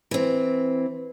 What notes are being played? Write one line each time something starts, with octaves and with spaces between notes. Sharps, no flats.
E3 C4